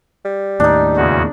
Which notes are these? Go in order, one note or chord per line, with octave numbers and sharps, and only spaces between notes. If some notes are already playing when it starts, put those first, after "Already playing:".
G3
D#2 A2 D4 D#4
E2 C#3 F#4